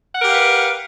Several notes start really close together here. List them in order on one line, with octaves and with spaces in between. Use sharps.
F#5 A#4 G4 F5 B4